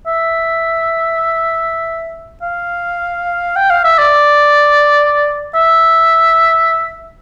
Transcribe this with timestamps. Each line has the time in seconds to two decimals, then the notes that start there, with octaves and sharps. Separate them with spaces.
0.07 E5
2.42 F5
3.56 G5
3.70 F5
3.84 E5
3.98 D5
5.55 E5